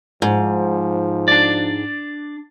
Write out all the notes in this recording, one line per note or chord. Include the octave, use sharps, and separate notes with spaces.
G#2 F3
D4 D5